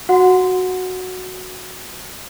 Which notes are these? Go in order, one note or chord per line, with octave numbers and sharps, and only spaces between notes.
F#4 F#5 C6